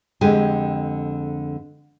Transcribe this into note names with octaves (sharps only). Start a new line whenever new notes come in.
F2 D3 G#3 G4 G#5